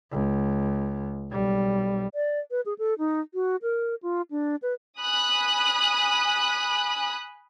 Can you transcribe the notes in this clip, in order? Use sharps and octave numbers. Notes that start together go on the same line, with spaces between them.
C#2
B1 G3
D5
B4
G#4
A4
D#4
F#4
A#4
F4
D4
B4
G#5 B5 D#6 F#6